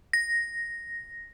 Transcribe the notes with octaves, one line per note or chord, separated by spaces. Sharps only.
A#6